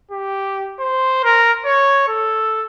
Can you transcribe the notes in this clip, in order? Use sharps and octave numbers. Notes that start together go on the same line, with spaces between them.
G4
C5
A#4
C#5
A4